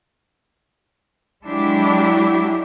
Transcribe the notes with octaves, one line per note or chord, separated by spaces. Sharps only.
F#3 G#3 D4 E4 G4